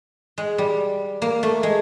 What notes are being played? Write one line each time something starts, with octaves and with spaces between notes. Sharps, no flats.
G#3
G3
A#3
A3
G#3